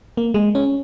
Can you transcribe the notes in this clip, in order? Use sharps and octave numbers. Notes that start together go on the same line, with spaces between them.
A#3
G#3
C#4